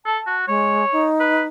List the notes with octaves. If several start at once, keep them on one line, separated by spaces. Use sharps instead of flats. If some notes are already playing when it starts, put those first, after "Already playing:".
A4 A5
F#4
G#3 C#5
D#4
B4